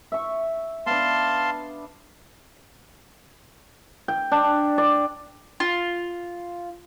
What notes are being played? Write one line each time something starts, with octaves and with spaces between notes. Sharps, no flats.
E5 C#6
B3 D4 F5 A5 C6
G5
D4
D5
F4